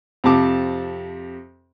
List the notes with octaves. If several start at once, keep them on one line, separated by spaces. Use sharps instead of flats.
F2 C3 A5 D6